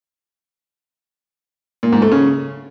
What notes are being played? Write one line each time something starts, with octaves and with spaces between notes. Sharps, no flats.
A#2
G#2
A3
C#3